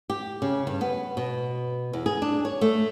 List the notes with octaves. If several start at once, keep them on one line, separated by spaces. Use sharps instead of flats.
G4
C#3
G2
B3
B2
E2
G#4
D4
C#5
A3